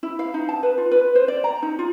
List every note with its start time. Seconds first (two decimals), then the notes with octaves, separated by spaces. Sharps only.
0.03 E4
0.19 F5
0.34 D#4
0.49 A5
0.63 B4
0.78 F4
0.91 B4
1.15 C5
1.28 D5
1.44 A#5
1.62 D#4
1.79 F4